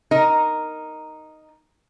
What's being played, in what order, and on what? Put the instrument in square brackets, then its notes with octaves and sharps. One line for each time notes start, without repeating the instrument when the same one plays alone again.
[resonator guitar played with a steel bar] D#4 A#4